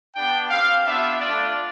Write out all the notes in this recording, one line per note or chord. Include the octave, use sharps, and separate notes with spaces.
B3 D4 G4 G5
C4 G4 F5
B3 D4 F4 E5
A3 D4 F4 D5